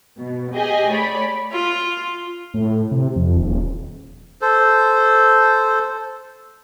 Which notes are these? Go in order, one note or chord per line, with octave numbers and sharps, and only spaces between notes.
B2
G4 G#4 D#5 G#5
A3 C#5 D5 B5
F4
A2
C3
F2
D#1
A4 C5